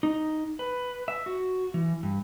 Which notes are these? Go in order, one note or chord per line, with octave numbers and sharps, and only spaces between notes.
D#4
B4
E5
F#4
E3
G2